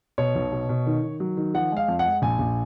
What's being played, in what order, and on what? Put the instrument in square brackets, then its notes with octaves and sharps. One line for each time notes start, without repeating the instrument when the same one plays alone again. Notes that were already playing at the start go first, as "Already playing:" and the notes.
[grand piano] B2 C#5
B1
B2
B2
D#3
D#3
F#3
D#3
F3 F#5
G#3 F5
F2
F#5
G#3
A#1 G#5
A#1